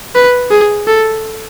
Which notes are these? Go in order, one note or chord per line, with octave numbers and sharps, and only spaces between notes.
B4
G#4
A4